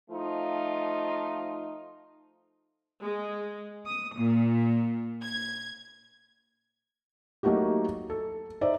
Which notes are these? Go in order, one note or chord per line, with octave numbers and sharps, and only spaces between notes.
F3 A3 D#4 F4
G#3
D#6
A#2
G#6
F#3 A3 A#3 D#4 F#4 G4
A4
D#4 C5 D5 E5